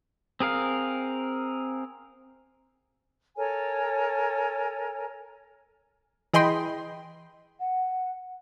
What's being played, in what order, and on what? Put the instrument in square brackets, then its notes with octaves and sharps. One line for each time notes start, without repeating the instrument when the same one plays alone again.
[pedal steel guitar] C4 G#4 A#4 F5
[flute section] A4 A#4 C#5 G#5
[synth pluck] E3 G#4 D#5 G5 B5 C6
[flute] F#5